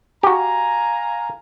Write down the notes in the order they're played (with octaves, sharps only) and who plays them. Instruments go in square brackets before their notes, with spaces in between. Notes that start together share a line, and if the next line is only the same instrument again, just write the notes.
[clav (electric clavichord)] F#4 G4 [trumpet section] F5 G#5 A#5